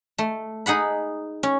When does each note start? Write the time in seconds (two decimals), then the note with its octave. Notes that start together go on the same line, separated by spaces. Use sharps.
0.18 A3
0.66 D#4 G#4 F#5 B5
1.43 C#4